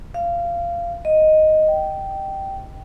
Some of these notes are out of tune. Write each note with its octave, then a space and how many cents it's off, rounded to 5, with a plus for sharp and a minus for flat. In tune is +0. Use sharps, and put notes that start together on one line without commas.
F5 -20
D#5 +0
G5 -10